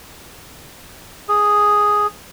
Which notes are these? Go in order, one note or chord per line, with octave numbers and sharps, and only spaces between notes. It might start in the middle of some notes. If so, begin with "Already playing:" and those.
G#4